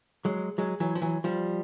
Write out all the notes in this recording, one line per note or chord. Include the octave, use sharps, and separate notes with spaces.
F#3 G#3
F#3 G#3
E3 F#3
F3
E3 F#3
F3 G3